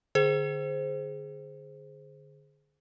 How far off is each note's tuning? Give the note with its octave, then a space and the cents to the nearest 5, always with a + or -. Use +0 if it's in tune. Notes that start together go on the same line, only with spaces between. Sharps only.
D3 +0 G#4 +10 C5 +0